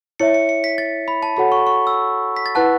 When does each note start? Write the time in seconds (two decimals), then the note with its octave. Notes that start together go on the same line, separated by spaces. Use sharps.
0.20 E4 C#5 E5 C#7
0.34 C#7
0.49 C#7
0.64 B6
0.78 A6
1.08 B5
1.23 A5
1.37 F#4 A4 C#5 F#5 B5
1.52 C#6
1.67 C#6
1.87 E6
2.36 B6
2.46 A6
2.55 E4 B4 F#5 A5 F#6